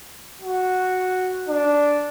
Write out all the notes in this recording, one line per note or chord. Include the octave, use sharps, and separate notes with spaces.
F#4
D4